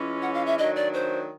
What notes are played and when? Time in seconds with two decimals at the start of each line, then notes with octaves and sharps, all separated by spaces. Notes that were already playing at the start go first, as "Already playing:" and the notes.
Already playing: E3 G#3 C#4 F4
0.22 F#5
0.34 F5
0.46 E5
0.58 D#3 F#3 A3 D4 D#5
0.76 D5
0.94 C5